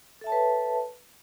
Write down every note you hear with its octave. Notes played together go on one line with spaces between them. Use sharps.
A4 B4 C#5 E5 A5